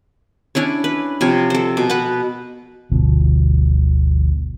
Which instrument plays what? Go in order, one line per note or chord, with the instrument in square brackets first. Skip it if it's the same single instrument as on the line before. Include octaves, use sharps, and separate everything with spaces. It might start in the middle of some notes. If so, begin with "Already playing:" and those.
[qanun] C#4 D4 E4 C#5
B4
C3 F3 C#5
A4 C5
B2
B4 F#5
[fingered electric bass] G1 D2 B2 F3